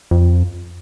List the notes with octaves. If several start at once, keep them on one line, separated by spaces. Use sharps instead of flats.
F2